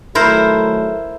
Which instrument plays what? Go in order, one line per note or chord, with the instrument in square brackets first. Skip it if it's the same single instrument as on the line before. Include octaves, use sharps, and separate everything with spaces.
[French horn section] D#3 F#3 A3 [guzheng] E4 A#4 C5